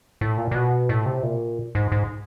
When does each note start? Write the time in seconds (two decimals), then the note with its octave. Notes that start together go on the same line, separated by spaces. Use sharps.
0.21 A2
0.38 A#2
0.51 A#2
0.55 B2
0.89 A2
1.06 C3
1.23 A#2
1.75 G#2
1.92 G#2